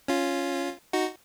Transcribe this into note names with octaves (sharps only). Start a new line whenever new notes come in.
C#4 F4
D#4 F#4